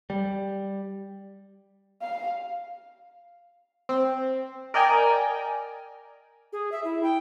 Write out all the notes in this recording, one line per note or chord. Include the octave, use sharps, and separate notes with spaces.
G3
F5
C4
A#4 D5 D#5 G5 G#5 A#5
G#4
E5
E4
G5